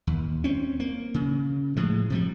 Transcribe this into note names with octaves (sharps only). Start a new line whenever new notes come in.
D#2
C4 C#4
A#3
C#3
A2 F3 G#3
C3 F3 G3